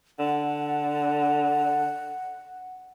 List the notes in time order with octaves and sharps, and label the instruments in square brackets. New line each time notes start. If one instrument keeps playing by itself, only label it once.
[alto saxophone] D3 [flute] F#5